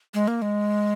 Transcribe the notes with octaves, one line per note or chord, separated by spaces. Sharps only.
G#3
A#3
G#3